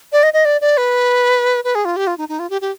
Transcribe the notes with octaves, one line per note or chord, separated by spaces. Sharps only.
D5
D#5
D#5
D5
D5
B4
B4
G#4
F4
G4
F4
D#4
D#4
F4
G4
G4